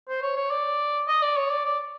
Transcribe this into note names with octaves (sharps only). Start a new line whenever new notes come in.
C5
C#5
C#5
D5
D#5
D5
C#5
D5
D5